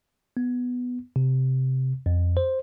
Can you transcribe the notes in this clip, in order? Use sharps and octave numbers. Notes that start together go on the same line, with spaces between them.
B3
C3
F2
C5